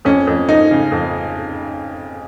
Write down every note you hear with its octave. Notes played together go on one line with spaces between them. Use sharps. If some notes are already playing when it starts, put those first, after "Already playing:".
F2 C#4
F2
F2 D#4
C#3
F2